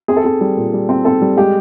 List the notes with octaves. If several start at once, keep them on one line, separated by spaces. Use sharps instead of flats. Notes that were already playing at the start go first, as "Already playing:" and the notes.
C4 G#4
A4
C4 G#4
G3
A#2
G3
C4
C4 A4
G3
G#3 G4